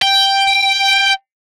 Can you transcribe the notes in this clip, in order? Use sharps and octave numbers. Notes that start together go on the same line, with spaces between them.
G5